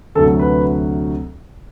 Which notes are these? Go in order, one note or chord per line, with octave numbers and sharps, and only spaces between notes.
D2 C3 F#3 A4
B4